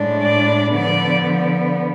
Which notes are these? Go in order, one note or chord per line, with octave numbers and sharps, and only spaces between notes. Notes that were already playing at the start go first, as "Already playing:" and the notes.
Already playing: A2 G#3 D4
D5
D3 F3 B3 D5